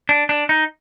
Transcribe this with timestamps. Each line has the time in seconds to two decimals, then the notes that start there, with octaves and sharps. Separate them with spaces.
0.09 D4
0.29 D4
0.49 D#4